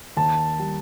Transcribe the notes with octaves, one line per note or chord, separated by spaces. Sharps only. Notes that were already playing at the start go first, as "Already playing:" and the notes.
D#2 A5
G3